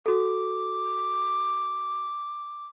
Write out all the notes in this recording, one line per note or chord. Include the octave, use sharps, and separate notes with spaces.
F#4 A4 D6